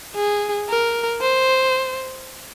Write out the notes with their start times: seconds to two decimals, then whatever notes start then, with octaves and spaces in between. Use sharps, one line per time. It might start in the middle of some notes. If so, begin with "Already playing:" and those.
0.16 G#4
0.69 A#4
1.21 C5